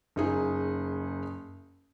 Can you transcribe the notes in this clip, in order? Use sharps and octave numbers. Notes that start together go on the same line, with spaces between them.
F#1 D#4 G#4